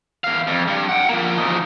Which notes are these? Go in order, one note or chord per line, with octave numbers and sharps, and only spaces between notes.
E2 F5
F2
G2
F#5 G5
F3 A#3
F3 D#4